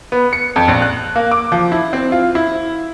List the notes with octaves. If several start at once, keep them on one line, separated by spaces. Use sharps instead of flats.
B3
C#7
F2
A#1
F#6
A#3
D6
F3
E4
C4
F4
E4